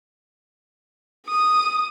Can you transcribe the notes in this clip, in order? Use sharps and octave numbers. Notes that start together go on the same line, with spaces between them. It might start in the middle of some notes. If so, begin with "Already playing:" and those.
D#6